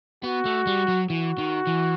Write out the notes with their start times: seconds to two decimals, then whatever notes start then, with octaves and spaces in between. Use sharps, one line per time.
0.24 B3 F#4
0.45 A3
0.67 G3
0.88 F#3
1.09 E3 F#4
1.38 D#3
1.67 E3